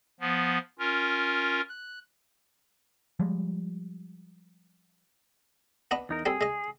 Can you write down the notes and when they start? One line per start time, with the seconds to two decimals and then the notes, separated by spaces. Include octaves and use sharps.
0.20 F3 B3
0.79 C#4 F4 A#4
1.69 F#6
3.20 F3 G3 G#3
5.91 B3 D4 D#5
6.09 E2 D#4 A#4
6.26 G3 C4 G#4 A4
6.41 G#3 D#5